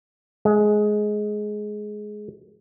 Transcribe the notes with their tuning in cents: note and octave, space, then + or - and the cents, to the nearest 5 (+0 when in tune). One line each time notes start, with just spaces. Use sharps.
G#3 +15